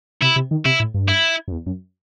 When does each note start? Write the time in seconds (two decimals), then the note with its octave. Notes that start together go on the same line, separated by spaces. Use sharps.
0.22 C3 E4
0.36 C3
0.51 D#3
0.65 C3 E4
0.80 A2
0.94 G2
1.08 E4
1.48 F#2
1.52 E2
1.66 F#2